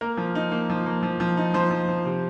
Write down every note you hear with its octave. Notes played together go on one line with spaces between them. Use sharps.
A#3 A#4
F3
D#4
A#3
F3
A#3
F3
F3
D#4
F3 C5
F3
F3
C3